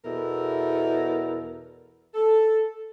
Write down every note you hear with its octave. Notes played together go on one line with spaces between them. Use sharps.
E2 B2 E4 A4 A#4
A4